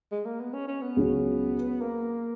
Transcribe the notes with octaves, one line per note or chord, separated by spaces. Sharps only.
G#3
A#3
B3
C#4
C#4
B3
C#2 C#3 F#3 C#4
A#3